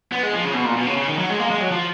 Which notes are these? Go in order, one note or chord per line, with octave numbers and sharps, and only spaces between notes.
B3
G#3
F3
C#3
B2
A#2
B2
C#3
C#3
D#3
F#3
G#3
A#3
G#3
F#3
F3